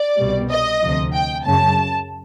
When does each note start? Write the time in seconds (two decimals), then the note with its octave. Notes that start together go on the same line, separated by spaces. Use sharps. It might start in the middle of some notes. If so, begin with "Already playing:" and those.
Already playing: D5
0.18 C2 B2 G3
0.50 D#5
0.81 D2 C3 F3
1.13 G5
1.45 F#2 C#3 F#3 A5